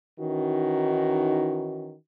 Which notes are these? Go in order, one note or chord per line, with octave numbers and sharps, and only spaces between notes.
D#3 E3 C#4 D#4 F#4